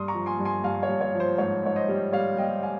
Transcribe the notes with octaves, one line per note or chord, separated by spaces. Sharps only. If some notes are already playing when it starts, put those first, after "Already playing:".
Already playing: G2 C6 D#6
A#5 C#6
F3
G#5 C6
G2
G#5 C6
G2 F5 G#5
C#5
G2
C#5
F3
C5
G#2 C#5
G#2 C#5
C5 D#5
G3
G3 C#5 F5
G3 D#5 G5
F5 G#5